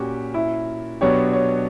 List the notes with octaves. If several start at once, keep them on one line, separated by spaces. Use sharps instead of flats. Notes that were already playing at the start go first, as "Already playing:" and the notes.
Already playing: A#2 A#3 C#4 F#4 G4
E4
B2 F#3 B3 D4 G4 C#5
C#5